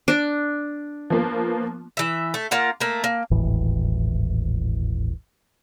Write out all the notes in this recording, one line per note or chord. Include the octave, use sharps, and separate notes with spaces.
D4
F3 A#3 B3
E3 E5
A3
A#3 F4 F#5
A3 A#3
A#3
D#1 G#1 A2 E3